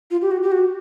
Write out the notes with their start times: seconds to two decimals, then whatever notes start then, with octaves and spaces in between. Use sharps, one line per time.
0.11 F4
0.22 G4
0.31 F#4
0.43 G4
0.52 F#4